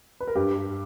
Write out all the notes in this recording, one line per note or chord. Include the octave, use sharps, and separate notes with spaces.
B4
A#4
G2 G4